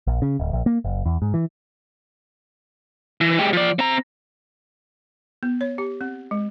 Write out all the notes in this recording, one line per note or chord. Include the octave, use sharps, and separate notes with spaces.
A#1
C#3
D1
A#1
A#3
F#1
E2
G#2
E3
E3
G#3 G4
F3 D5
C4 A#5
B3
C#5
G4
C4
G#3